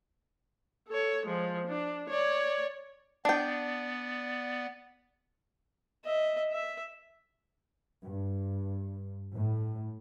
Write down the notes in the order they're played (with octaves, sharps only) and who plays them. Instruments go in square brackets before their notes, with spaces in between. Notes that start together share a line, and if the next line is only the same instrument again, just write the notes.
[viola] A4 C#5
F3 G#3
D4
C#5 D5
[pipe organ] B3 D5 [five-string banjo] D4 G5
[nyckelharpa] D#5 E5
E5
[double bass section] G2
A2